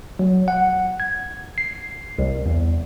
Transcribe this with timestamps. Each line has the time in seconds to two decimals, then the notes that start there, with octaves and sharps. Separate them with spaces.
0.19 F#3
0.48 F#5
1.00 G#6
1.58 C7
2.19 C2
2.46 E2